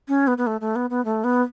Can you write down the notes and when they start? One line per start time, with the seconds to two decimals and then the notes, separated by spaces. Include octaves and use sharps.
0.08 C#4
0.27 B3
0.38 B3
0.46 A3
0.61 A3
0.75 B3
0.90 B3
1.05 A3
1.24 B3